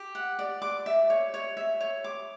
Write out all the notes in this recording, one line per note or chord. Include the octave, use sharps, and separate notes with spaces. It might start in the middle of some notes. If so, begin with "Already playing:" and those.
Already playing: G4
F#5
D5
D6
E5
C#5
C#5
E5
C#5
D6